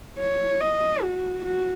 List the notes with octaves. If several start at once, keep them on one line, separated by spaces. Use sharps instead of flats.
C#5
D#5
F#4
F#4